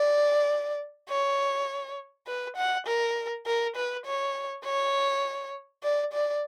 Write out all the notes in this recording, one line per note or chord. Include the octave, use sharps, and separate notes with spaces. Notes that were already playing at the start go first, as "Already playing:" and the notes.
Already playing: D5
C#5
B4
F#5
A#4
A#4
B4
C#5
C#5
D5
D5